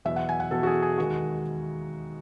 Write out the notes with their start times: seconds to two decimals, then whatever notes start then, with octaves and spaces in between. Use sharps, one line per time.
0.05 E2 B2 F#3 E5
0.16 F#5
0.29 G#5
0.40 F#5
0.51 E2 B2 F#3 A4
0.63 F#4
0.67 G#4
0.82 G#4
0.98 D#2 D#3 G#3 F#4